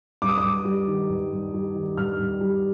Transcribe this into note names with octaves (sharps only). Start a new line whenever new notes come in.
G2 D6
D#6
D6
G2
G3
D#3
G2
G2
G3
D#3
G2 F6
G2
G3